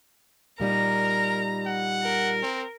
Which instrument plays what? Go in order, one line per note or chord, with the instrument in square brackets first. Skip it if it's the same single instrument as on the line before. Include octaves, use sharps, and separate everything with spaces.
[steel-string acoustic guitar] A#2 G3 D#4 [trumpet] A#4 [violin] A#5
[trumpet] F#5
[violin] A#4
[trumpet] C4